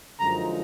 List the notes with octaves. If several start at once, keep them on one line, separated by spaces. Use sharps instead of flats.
F#2 D3 F3 G#3 D#4 A#5